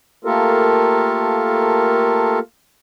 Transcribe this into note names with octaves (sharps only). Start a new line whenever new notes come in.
A3 A#3 F4 G4 A4 A#4